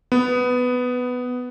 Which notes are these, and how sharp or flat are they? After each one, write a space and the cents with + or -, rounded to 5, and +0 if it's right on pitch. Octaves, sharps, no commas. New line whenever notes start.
B3 +10